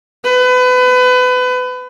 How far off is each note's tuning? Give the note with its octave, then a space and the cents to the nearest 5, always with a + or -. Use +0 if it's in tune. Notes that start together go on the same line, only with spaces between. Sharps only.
B4 +30